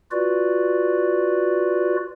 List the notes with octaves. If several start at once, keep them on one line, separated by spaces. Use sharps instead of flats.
F4 F#4 B4 D5